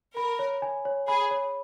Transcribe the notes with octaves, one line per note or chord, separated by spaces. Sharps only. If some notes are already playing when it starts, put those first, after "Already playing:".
A#4 B5
C#5
G#5
C#5
G#4 B5
C#5